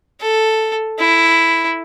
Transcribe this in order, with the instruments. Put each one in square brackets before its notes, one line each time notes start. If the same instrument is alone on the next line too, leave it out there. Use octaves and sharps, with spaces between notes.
[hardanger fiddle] A4
E4